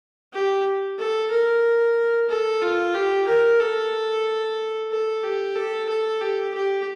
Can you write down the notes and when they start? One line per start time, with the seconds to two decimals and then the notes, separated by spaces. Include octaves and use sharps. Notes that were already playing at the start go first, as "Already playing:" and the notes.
0.33 G4
0.98 A4
1.31 A#4
2.29 A4
2.62 F4
2.94 G4
3.27 A#4
3.60 A4
4.91 A4
5.23 G4
5.56 A4
5.89 A4
6.21 G4
6.54 G4